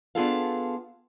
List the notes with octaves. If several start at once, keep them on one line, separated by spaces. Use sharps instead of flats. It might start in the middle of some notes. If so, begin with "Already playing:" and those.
B3 D4 F4 G#4 A4 F5